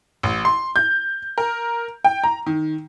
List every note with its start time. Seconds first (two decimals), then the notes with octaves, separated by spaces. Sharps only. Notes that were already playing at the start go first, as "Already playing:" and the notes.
0.23 A1
0.45 C6
0.76 G6
1.38 A#4
2.04 G5
2.24 A#5
2.46 D#3